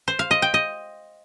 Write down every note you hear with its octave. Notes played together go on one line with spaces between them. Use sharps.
C5
F5
D#5
G5
D#5